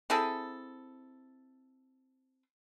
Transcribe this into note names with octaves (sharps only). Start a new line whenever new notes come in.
C4 E4 G#4 A4